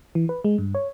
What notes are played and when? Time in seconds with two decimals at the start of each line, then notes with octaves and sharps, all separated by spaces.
0.15 E3
0.29 B4
0.44 G#3
0.58 G2
0.75 C#5